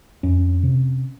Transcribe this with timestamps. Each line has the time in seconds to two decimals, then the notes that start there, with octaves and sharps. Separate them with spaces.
0.23 F2 C#4
0.63 C3